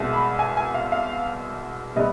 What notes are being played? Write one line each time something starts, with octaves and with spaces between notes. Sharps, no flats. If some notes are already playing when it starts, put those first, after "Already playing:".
Already playing: C2 B2 G#3
B5
G#5
G#5
F5
F5
C3 G3 B3 D#5